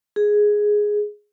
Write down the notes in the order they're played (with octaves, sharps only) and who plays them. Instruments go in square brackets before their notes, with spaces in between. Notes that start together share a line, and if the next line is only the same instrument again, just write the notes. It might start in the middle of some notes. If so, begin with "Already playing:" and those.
[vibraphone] G#4